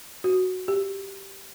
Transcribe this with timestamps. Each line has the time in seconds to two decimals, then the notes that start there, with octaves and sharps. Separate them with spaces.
0.24 F#4
0.68 G4